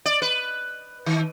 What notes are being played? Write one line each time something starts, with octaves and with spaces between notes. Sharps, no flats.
D5
B4
D#3